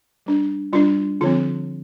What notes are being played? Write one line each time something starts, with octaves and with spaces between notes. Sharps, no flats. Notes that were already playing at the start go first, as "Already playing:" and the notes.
G3 D4
G3 D4 F4
D3 F3 C4 F4